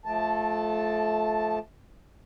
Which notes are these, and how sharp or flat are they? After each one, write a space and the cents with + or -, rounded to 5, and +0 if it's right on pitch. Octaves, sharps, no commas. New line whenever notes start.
F3 +0 A3 -25 A5 +0